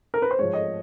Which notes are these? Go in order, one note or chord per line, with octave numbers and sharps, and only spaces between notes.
A#4
B4
C5
G#2 F3 C#5
D#5